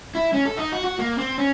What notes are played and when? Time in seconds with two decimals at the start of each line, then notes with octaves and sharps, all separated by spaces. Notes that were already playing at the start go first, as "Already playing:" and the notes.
0.15 E4
0.33 C#4
0.46 A4
0.57 D#4
0.72 F#4
0.84 F#4
0.99 A#3
1.18 C4
1.38 C#4